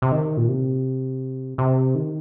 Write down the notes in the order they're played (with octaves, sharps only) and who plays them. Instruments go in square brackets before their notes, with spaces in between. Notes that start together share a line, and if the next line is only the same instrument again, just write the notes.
[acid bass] C3
D#3
A#2
C3
C3
D#3